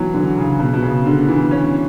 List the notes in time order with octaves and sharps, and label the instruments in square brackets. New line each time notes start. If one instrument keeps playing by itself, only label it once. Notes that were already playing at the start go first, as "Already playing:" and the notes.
Already playing: [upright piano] E3 F#3
D3
C#3
B2
B2
C#3
D3
E3
C#4